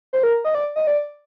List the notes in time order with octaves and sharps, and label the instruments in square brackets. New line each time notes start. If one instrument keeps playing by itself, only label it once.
[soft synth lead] C5
A#4
D#5
D5
D#5
D5